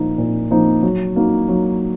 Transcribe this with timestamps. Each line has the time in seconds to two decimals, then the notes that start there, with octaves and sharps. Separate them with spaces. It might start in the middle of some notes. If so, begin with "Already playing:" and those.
Already playing: A#2 F3 A#3 D#4
0.18 A#2
0.51 F3 A#3 D#4
0.83 F#3
1.16 A#3 D#4 F#4
1.48 F#3